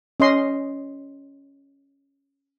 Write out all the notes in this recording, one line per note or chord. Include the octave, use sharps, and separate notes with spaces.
C#4 D#5 C6